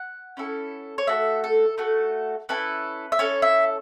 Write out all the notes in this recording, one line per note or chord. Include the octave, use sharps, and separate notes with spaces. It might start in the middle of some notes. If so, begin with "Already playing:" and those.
Already playing: F#5
C#4 E4 A4
C#5
A3 F#4 A4 E5
A4
A3 F#4 A4
C#4 E4 A4 B4
E5
C#4 E4 A4 C#5
E5